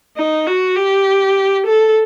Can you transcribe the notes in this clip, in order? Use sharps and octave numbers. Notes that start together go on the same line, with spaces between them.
D#4
F#4
G4
A4